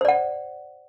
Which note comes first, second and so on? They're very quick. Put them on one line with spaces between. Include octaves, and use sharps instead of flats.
C5 D5 F#5